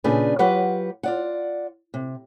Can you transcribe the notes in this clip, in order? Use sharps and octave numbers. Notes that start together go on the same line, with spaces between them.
A#2 C#3 D4 G#4 B4
F#3 F4 G4 B4 F#5
F4 D5 F#5
C3